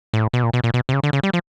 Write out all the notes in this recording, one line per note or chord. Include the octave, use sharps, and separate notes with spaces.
A2
B2
A#2
B2
A#2
B2
C3
C#3
D3
C#3
G3
F3